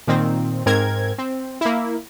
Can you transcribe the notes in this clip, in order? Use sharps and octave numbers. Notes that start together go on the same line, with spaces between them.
A#2 D#3 C4
G#2 C4 A#4 G#6
C4
A#3 E4